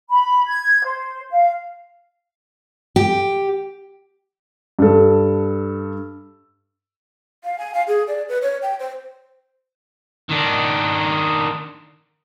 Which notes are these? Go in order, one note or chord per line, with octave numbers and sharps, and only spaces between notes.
B5
G#6
C5
F5
G4
G2 A4
F5
G#5
F5
G#4
D5
B4
C#5
G5
C5
D#3 D4